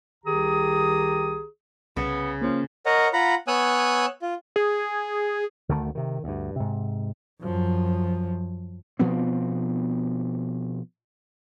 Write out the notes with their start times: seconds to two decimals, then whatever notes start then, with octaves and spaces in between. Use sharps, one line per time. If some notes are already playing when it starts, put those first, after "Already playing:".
0.25 C2 D#3 G4 G#4 A#5 D#6
1.97 C2 C#3 B3
2.41 F3 A#3 C#4
2.86 A#4 C#5 D#5 F#5
3.13 F4 F#5 A#5 B5
3.48 B3 C#5 G#5 D#6 E6 F#6
4.22 F4
4.56 G#4
5.69 D2 D3 D#3 A3
5.95 C3 D#3
6.24 D2 G2
6.56 G#2 C3
7.41 F#2 F3
8.99 B2 F3 B3 C4